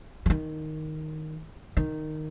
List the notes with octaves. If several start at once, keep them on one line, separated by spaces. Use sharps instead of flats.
E3
D#3
D#3